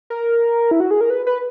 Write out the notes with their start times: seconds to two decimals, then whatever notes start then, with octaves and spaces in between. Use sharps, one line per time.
0.10 A#4
0.71 E4
0.80 F#4
0.91 G#4
1.01 A#4
1.10 B4
1.27 B4